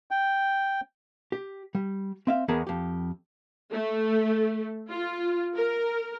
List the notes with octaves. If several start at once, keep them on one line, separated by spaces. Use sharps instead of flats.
G5
G4
G3
C4 E5 F5
E2 B3 G#4 A#4 F#5 A5
F2 G4
A3
F4
A#4